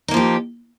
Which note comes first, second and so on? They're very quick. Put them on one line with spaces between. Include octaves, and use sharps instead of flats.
D#4 A#3 F3 G4